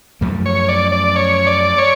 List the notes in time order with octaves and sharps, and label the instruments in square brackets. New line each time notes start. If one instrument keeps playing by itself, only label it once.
[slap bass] F#2 F3 A3
[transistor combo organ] C#5
D5
D5
C#5
D5
C#5